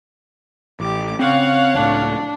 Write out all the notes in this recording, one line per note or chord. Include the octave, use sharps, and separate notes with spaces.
A1 G4 D6
C#3 C4 C#5 F5 F#5
C#2 A2 D4